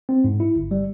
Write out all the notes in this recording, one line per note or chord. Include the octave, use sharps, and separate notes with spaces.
C4
G#2
E4
G1
G3